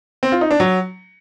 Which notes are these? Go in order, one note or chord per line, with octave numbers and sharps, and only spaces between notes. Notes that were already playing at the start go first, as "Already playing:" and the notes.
C4
F4
D#4
D4
F#3